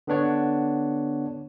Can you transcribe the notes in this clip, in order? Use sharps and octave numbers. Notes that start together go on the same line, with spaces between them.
D3 B3 D4 C#5 F#5